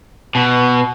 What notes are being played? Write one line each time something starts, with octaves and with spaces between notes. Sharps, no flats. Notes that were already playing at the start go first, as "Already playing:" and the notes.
B2